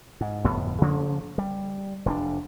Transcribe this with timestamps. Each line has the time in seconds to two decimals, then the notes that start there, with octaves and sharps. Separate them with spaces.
0.21 G#2
0.45 G1 F2 A2 B3
0.81 C#3 F3 A#3 C#4
1.38 G3
2.06 F1 C4 D4